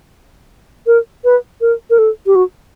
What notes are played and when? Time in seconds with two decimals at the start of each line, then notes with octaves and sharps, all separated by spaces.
0.87 A#4
1.24 B4
1.61 A#4
1.90 A#4
1.98 A4
2.26 G4
2.35 F#4